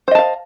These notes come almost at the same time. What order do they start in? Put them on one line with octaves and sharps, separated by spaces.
C5 D#5 A5 F5